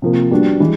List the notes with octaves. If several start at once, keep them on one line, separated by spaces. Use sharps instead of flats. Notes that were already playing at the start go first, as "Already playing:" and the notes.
C3 F3 A#3
G3 B3 D4 F#4
E3 G#3